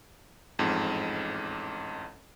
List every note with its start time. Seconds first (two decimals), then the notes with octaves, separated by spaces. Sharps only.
0.59 A1 F2 G#2